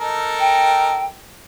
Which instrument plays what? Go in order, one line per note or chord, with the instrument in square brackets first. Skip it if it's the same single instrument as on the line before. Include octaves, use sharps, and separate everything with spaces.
[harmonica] D#4 A4 A#4
[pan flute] G5